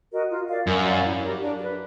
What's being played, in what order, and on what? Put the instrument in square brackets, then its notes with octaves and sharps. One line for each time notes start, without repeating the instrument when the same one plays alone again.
[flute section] F#4 A#4 D#5
F4
A#4 D5 F5
[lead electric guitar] F#2 [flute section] A#4
[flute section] D5 F5
E4
G4 A#4
D4
G4
B4